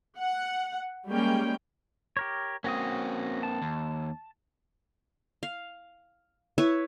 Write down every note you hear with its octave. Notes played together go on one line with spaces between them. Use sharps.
F#5
G3 G#3 A#3 C#4 G5
G4 A#4 C#5
A#3 C4 C#4 F#4 D#6
A5
D#2
F5
E4 B4 C#5 E5